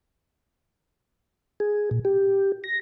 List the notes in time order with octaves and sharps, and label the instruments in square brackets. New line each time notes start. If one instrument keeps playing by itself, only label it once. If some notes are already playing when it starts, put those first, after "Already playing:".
[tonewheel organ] G#4
A#2
G4
A#6